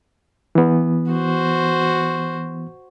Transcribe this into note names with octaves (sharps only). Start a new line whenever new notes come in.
E3 B3
F#4 C5